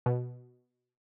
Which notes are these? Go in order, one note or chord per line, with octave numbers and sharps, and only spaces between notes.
B2